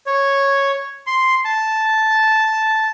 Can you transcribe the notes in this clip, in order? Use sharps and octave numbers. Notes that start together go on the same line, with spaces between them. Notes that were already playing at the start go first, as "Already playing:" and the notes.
C#5
C6
A5